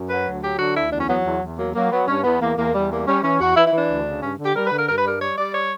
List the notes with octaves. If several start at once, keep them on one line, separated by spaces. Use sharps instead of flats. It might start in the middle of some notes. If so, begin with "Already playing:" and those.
Already playing: F#2
F#3 B4
D2
F#3 G4
D3 F#4
D2 E4
E2 D4
C#4
F#3 B3
E2
E2
F#3 A#3
F#3 A#3
F#3 B3
G2 C#4
E2 B3
E2 A#3
E2 A#3
E2 G3
G3 A#3
G3 C#4
E3 C#4
E2 F#4
E3 E4
E4
E3 D4
D2
C#3
G2 C#4
D3 G4
G3 A#4
D3 B4
A#4
G2 A#4
B4
G3 A#4
G3 C#5
G3 D5
C#5